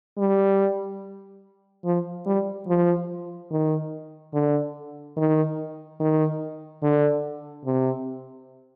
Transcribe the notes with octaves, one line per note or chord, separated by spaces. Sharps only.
G3
F3
G3
F3
D#3
D3
D#3
D#3
D3
C3